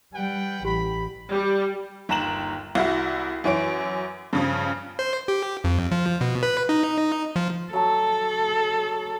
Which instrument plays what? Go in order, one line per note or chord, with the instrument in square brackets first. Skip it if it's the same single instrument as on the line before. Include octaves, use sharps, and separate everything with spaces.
[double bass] G3 [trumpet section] B4 F#5 G5
[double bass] A1 [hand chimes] G4 [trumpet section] B5
[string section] G3
[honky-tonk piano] G1 D#2 A#5 E7 F#7
C2 E4 F#4
F#2 E3 C#5 D7
G2 C#3 F3
[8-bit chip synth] C5
G4
F2
F3
B2
B4
D#4
F3
[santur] F#3 A5 [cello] A4